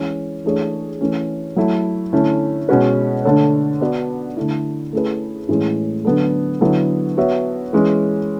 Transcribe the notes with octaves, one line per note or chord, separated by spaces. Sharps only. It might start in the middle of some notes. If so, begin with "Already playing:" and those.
Already playing: E3 G#3 C#4
E3 A3 D4 G#4 C#5
E3 A3 C#4
F#3 A3 E4
D3 A3 C#4 E4
B2 G#3 C#4 F#4 B4
D3 A3 D4 A4 C#5
B3 F#4 B4 D5
D3 A3 E4
A3 C#4 E4 G#4 B4
A2 E3 G#3 C#4 G#4
D3 F#3 B3 D4 A4
D3 F#3 B3 E4 A4
B3 F#4 C#5 E5
E3 G#3 C#4